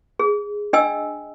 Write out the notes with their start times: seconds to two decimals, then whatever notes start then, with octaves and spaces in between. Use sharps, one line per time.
0.19 G#4
0.73 D4 D#5 G5 G#5 E6